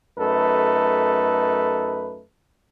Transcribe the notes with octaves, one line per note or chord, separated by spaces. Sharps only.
F#2 A3 D#4 A4 B4